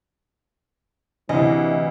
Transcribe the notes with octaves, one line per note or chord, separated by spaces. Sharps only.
D2 C3 E3 D#5